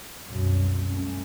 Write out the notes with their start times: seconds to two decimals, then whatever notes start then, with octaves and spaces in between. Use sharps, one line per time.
0.25 C2 F#2 B2
0.88 G2 A3 C#4